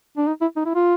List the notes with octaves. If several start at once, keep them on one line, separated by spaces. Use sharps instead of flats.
D4
D#4
E4
D#4
E4
F4